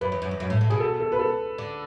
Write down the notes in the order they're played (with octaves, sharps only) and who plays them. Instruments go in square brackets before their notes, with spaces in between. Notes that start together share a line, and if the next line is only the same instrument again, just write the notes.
[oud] F#2 [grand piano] B4
[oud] E2
F#2
E2
F#2
A2
A2
[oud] B2 [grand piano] G#4
[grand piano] A4
A4
B4
A4
[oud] D3